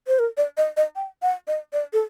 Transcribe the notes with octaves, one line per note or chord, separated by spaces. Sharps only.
C5
A#4
D5
D#5
D#5
G5
F#5
D#5
D5
A4